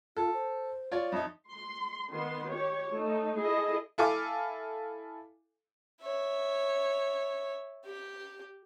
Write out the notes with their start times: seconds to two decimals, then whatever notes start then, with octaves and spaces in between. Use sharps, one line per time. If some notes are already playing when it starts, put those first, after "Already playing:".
0.17 F4 A4
0.34 C5
0.92 F4 C#5 D5
1.12 F2 D#4 E5
1.49 C6
2.10 D#3 B3 C6
2.51 G4 C#5
2.92 A3 D#4
3.41 E4 G#4 A4 D#5
3.98 E4 A4 F5 G#5 D6
6.01 C#5 E5
7.85 G4